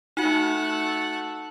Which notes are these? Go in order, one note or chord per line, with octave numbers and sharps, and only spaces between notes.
A3 D#4 F#4 F#5